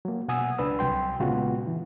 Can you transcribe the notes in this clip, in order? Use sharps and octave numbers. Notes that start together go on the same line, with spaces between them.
F#3 A#3
B2 F#5 G#5 D#6 E6
C#2 D4 B4 E6
C2 F#3 G5 C6
A#2 C#3 G#3 B3 F4 F#4
E3